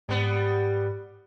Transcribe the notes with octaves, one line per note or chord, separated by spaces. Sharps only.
G#2 G3 B3